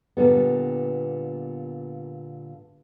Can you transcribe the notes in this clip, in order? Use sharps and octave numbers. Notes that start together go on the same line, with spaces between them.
A#2 D3 G3 B3